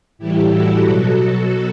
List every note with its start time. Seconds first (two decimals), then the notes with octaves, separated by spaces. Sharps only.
0.18 A2 E3 G3 E4 G4
0.50 F#4 A4
0.81 B2 F#3